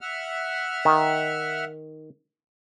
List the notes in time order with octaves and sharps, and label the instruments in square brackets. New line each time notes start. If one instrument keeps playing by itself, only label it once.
[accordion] E5 F#5 F6
[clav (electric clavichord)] D#3